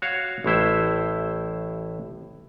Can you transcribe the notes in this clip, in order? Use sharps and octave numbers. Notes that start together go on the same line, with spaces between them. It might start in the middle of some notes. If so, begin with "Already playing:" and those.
F#4 C#5 F5
A1 A2 E4 C5